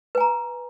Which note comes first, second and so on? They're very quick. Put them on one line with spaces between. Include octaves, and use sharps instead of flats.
B4 G#5 A#5